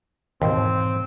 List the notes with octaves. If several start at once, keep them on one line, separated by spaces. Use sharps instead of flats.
D#2 G#2 B2 E3 C4